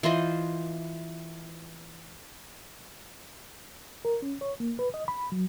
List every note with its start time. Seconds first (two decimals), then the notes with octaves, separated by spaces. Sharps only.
0.03 E3 F4 C5 D#5
4.05 A#4
4.22 C#4
4.41 C#5
4.60 A#3
4.79 B4
4.94 D#5
5.08 B5
5.32 F#3